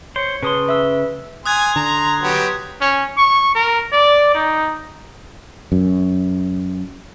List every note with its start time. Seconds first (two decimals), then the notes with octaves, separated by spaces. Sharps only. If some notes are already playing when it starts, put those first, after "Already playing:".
0.16 C5 C#5 C#7
0.43 C#3 B4 A5 C6 D#6
0.66 B4 E5 E6
1.46 G#5 C6 D#6 F#6 G#6
1.76 D3 A#5
2.22 F#3 B3 G4
2.81 C#4
3.17 C#6
3.55 A#4
3.92 D5
4.34 D#4
5.72 F#2